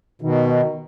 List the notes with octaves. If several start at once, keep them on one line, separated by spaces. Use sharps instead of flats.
B2 D#3